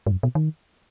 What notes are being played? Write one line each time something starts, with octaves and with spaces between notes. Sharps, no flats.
G#2
F#2
B2
D#3